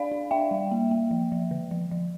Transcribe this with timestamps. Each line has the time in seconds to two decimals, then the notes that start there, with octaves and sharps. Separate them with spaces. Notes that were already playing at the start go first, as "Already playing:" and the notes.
Already playing: D4 D5 F5
0.12 D4
0.31 D4 E5 G5
0.51 G3
0.71 A#3
0.91 A#3
1.11 F3
1.32 F3
1.51 D3
1.71 F3
1.91 F3